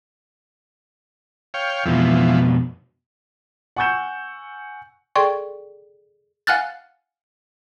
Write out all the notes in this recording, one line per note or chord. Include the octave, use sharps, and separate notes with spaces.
C#5 F5 G5
F2 B2 E3 F3
F#5 G#5 C#6 E6 G6 E7
G#4 A4 D5 G5 C6 C#6
F5 F#5 G#5 F6 F#6 A6